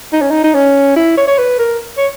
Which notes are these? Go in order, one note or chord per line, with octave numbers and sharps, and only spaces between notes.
D#4
C#4
D#4
D#4
C#4
E4
C#5
C#5
B4
A#4
C#5